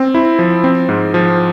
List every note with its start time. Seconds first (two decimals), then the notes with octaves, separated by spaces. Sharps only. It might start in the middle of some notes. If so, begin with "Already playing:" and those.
Already playing: C4
0.14 E4
0.39 F3
0.64 C4
0.89 G#2
1.14 F3